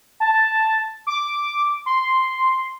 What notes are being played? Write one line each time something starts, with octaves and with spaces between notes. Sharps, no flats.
A5
D6
C6